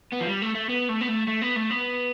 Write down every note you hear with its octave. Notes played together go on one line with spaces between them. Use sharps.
B3
F3
G3
A3
A3
B3
A3
B3
A3
A3
B3
A3
B3